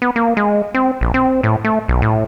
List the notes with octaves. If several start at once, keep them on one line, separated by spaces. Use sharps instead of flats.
B3
A#3
G#3
C4
A#1
C4
A2
A3
B1
A2